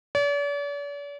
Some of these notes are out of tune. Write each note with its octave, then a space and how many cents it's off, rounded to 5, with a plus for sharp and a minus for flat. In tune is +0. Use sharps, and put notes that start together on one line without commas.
D5 -45